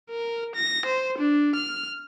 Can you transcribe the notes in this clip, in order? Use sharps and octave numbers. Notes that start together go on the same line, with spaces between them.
A#4
A#6
C5
D4
F6